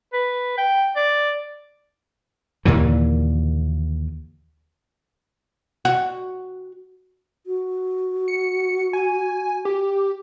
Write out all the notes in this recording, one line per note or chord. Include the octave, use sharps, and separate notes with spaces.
B4
G5
D5
D#2 A#2 D3 E3
F#4 F#5
F#4
C#7
G#5
G4